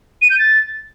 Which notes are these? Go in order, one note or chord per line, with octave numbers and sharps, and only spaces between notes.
D#7
G6
A6